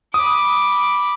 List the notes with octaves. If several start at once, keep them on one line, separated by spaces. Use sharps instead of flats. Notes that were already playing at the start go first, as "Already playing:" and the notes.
B5 D6 D#6